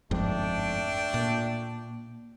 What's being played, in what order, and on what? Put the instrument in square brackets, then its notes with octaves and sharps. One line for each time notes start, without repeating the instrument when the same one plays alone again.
[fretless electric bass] G1 F2 G#2 [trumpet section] A3 D4 G5
[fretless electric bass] A#2